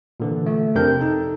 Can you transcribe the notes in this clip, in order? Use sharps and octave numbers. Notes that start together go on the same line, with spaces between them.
A#2 D3 E3
A3
F2 C3 C4 D4 A#4 G6
D#4 A4